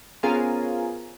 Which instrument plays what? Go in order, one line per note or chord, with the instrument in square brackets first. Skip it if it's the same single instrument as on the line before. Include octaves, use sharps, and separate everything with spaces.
[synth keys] B3 C#4 F4 G#4 A#4 C5